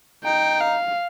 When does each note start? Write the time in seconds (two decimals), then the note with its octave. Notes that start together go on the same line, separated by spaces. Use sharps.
0.24 D#4 G5
0.61 F5